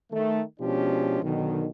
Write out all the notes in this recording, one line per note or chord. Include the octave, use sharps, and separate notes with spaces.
D#3 A3
B2 F3 G#3 C#4 D4 G4
B1 B2 D3 D#3